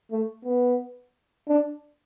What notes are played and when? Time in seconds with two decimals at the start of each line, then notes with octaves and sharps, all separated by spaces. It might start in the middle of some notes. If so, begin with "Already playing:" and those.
0.11 A3
0.45 B3
1.48 D4